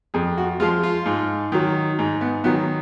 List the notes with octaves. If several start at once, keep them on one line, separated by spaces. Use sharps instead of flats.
F2 G#4
F#4
F3 G#3 F4
F4
G#2
D#3 F#3
G#2
B3
D#3 F#3 B3